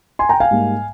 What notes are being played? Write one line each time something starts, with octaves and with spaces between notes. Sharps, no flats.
G#5 C6
G5 A#5
F5 G#5
G#2 G3 A#3